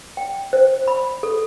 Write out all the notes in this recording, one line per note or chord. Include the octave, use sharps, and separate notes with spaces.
G5
C5
B5
A4